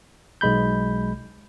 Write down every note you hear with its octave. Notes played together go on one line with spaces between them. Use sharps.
B1 G#3 B5 G6